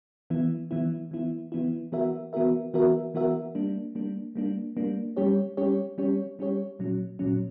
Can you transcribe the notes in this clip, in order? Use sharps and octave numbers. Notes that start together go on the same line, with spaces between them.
E3 B3 E4
E3 B3 E4
E3 B3 E4
E3 B3 E4
E3 B3 F#4 A#4 E5
E3 B3 F#4 A#4 E5
E3 B3 F#4 A#4 E5
E3 B3 F#4 A#4 E5
G3 A#3 D4
G3 A#3 D4
G3 A#3 D4
G3 A#3 D4
G3 C#4 G4 C#5
G3 C#4 G4 C#5
G3 C#4 G4 C#5
G3 C#4 G4 C#5
A#2 F#3 C#4
A#2 F#3 C#4